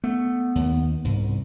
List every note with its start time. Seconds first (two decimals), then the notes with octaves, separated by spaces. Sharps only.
0.04 A3 B3
0.55 D#2
1.05 C2 G#2